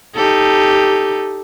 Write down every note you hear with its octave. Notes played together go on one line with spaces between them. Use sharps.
D#4 G4 A4